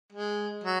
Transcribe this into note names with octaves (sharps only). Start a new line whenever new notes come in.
G#3
F#3